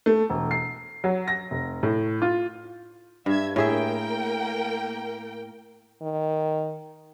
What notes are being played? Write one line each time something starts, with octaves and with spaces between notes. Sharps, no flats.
A3
E1
C7
F#3
A#6
F1
A2
F4
G2 E5 G#6
A2 A#3 G#4 A#4 E5 G5
D#3